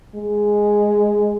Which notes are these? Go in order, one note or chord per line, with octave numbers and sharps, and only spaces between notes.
G#3